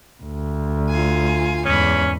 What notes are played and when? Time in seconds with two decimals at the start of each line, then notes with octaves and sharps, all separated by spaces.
0.23 D2
0.88 F4 G#5
1.65 E2 G#2 C#4 B5